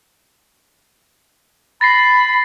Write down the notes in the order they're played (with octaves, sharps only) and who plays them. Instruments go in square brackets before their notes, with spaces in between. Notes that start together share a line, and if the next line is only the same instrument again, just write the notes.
[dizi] B5 [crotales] A6 A#6 C7